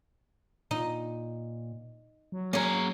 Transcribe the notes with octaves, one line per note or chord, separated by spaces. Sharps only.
A#2 D#4
F#3
A#3 C#4 G#4 C#5 A#5